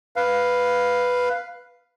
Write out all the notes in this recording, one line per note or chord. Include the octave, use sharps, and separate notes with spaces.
B4 F5